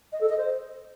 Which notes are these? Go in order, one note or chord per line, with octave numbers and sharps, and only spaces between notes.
D#5
A4
D#5
C5